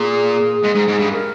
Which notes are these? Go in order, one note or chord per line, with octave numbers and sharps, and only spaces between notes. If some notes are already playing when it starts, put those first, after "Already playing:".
Already playing: A#2 G#4
G#2
G#2
G#2
G2
A#4